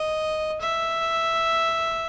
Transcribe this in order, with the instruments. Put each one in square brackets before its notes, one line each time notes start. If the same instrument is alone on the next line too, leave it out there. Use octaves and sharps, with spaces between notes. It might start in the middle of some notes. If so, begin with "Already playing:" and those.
Already playing: [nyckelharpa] D#5
E5